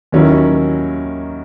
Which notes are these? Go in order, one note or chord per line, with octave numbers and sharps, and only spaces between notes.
D#2 D#3 F#3 C#4 E4